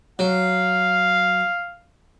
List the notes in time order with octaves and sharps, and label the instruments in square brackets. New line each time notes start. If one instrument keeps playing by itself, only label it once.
[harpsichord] F#3 [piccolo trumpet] F5